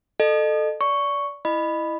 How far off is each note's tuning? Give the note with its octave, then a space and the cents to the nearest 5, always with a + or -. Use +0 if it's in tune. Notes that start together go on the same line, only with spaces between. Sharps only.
A4 +0 D#5 -35
D5 -25 C#6 +0
E4 +0 D#5 -25 B5 +0